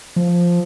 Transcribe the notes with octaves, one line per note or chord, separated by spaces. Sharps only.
F3